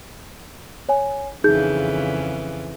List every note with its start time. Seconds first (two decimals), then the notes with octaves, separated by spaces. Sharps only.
0.89 C#5 G#5
1.44 F2 C#3 E3 D#4 G#4 G6